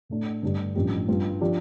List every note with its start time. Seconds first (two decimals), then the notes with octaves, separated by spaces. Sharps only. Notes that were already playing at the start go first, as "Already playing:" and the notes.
0.09 A2 A3 D4
0.43 G2 D3 A3 D4 G4
0.75 A1 G2 F3 D4 G4
1.08 G2 G3 F4
1.41 F3 D4 G4